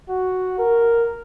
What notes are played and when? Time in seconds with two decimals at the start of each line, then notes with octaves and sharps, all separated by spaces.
0.09 F#4
0.59 A#4